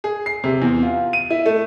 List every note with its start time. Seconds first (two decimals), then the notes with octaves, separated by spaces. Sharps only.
0.04 G#4
0.26 C7
0.44 C3
0.62 E2
0.83 F4
1.13 D#7
1.30 E4
1.46 A3